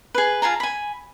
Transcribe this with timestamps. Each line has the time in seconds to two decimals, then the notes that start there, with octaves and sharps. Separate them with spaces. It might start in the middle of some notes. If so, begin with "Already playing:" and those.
0.15 G#4 B4
0.42 F4 G#4 A5 A#5
0.60 G#5 B5